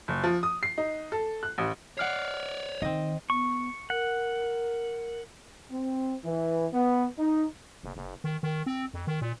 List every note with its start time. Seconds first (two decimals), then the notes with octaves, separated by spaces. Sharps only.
0.08 F#1
0.24 F3
0.43 D#6
0.63 C7
0.78 D#4
1.12 A4
1.43 F#6
1.58 A1
1.97 C#5 D5 F#5 F6 C7
2.82 D#3 C4 D#5
3.30 B3 C#6
3.90 A#4 F#5
5.71 C4
6.25 E3
6.73 B3
7.18 D#4
7.84 F#1
7.96 F#1
8.24 D#3
8.43 D#3
8.66 C4
8.94 F2
9.07 D#3
9.21 A#2